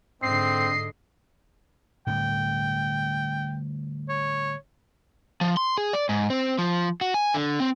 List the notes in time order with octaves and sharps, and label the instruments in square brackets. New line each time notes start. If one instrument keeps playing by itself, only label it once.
[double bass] G#2 D3 [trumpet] C4 [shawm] D#5 [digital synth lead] C7
[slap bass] A2 D3 G3 [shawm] G5
[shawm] C#5
[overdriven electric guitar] F3
C6
G#4
D5
G#2
C4
F3
F#4
G#5
D3
C4